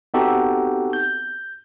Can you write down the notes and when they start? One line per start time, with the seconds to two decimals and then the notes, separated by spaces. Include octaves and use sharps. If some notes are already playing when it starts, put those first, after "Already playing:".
0.14 B3 C4 D#4 F#4 G4 A4
0.93 G6